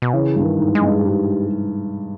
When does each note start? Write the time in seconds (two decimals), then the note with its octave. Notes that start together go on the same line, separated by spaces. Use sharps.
0.02 B2
0.13 C#3 E3
0.36 G2
0.44 D#3
0.59 G#2
0.75 G#3
0.82 G2
1.05 G#2 G3